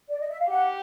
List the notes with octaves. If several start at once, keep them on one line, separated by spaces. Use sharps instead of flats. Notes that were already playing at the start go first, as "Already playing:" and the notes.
D5
D#5
E5
F5
G4 F#5